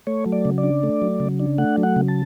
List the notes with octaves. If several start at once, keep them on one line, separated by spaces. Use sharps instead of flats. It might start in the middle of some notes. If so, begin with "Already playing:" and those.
A3 C#5
F#3
D5
C#3
D5
D4
A3
F#3
C#3
D4
A3 F#5
F#3
F#5
C#3
A5